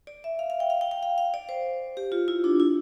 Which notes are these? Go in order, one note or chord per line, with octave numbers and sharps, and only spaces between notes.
D5
E5
F5
F5
G5
F5
G5
G5
F5
F5
D5
C5
G4
F4
E4
D4
E4